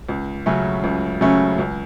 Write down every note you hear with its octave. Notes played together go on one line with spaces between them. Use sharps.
C#2
C#3 F#3 A3 C#4
C#2
C#3 F#3 A3 C#4
C#2